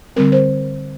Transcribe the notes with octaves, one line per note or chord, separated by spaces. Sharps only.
D3 G3 C4 A#4
C5